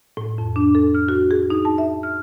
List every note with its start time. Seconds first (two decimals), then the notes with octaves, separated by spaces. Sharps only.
0.17 A2
0.38 F2
0.56 D4
0.75 A4
0.95 F6
1.09 F#4
1.31 G#4
1.50 D#4
1.65 A5
1.78 E5
2.03 F6